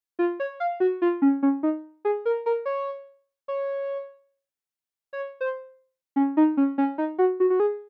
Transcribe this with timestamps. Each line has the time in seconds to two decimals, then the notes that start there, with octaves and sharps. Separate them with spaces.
0.19 F4
0.40 C#5
0.60 F5
0.80 F#4
1.02 F4
1.22 C#4
1.43 C#4
1.63 D#4
2.05 G#4
2.25 A#4
2.46 A#4
2.66 C#5
3.48 C#5
5.13 C#5
5.41 C5
6.16 C#4
6.37 D#4
6.57 C#4
6.78 C#4
6.98 D#4
7.18 F#4
7.40 F#4
7.50 F#4
7.60 G#4